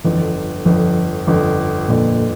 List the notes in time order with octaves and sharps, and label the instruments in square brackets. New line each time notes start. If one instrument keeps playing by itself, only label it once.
[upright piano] G1 F2 D3 [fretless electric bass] E3
[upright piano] G1 F2 D3 [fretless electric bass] F3
[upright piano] G1 F2 D3
[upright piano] G1 F2 D3 [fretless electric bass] A#2